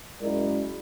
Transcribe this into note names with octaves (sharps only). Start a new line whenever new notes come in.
F#2 G#3 E4 A#4 D5